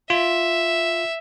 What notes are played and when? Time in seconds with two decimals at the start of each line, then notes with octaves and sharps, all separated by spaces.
0.10 F4 E5